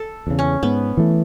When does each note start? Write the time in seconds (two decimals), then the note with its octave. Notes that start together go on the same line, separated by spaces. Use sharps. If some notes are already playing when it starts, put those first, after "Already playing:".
Already playing: A4
0.27 E2 C#3
0.39 C#4
0.63 G#2 B3
0.97 E3 A3